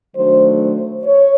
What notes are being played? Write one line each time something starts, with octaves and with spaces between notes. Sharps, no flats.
D#3 F#3 A3 D4 C5
C5
C#5